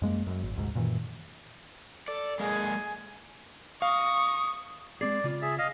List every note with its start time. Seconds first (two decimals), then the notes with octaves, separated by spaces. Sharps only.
0.02 F#2 G#3 A#3
0.27 F#2
0.43 G#1
0.56 F1 D2 G#2
0.75 F#2 A#2 D#3 E3
2.08 A4 D5
2.40 G#3 A#3 G#4 G#5
3.82 F5 C#6 D#6
5.01 G#3 C4 G#4 D5
5.24 C#3 F4
5.42 G#4 E5
5.59 D#5 F5